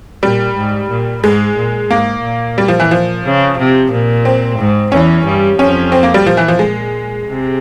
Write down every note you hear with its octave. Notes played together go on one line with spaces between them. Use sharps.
A#2 G3
G#2
A#2
G#2 G#3
A#2
G#2 A#3
A#2
G3
F3
E3
F3
C#3
C3
A#2
C4
G#2
E2 E3 C#4
G2 G3
F2 F3 C#4
C4
A#3
G3
A#2 F3
E3
F3
G#3
C3